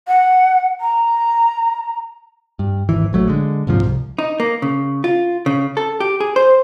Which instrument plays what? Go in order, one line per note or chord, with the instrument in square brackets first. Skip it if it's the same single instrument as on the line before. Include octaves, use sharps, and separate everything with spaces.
[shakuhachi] F#5
A#5
[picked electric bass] G2
D#1 G#1 E3
A#1 F#3 A3
D3 G#3
D#1 G#2 C3 F3
C2
[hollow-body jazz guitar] D#4
A#3
C#3
F4
C#3
A4
G4
G#4
C5